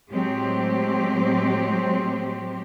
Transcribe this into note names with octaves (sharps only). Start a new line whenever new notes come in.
A2 F#3 G#3 C4 G4